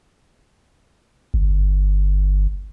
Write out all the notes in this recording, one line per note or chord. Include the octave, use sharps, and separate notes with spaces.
G1